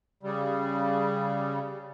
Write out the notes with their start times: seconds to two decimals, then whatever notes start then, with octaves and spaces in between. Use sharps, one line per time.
0.23 C#3 G3